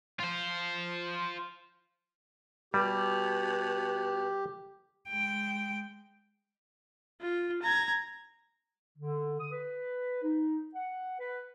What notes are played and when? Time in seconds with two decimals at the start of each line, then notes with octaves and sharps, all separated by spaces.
0.20 F4 C5
2.74 B2 G3 G4
5.09 G#3 G5
7.21 F4
7.62 A#5 G#6
8.98 D3
9.39 D#6
9.52 B4
10.23 D#4
10.75 F#5
11.20 B4